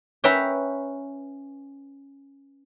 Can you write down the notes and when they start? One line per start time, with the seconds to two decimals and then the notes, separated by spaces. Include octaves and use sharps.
0.24 C#4 B4 E5 G5 A#5